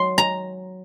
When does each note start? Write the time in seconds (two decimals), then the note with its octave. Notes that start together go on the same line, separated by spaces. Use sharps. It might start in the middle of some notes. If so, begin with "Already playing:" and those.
Already playing: F#3 C6
0.18 A#5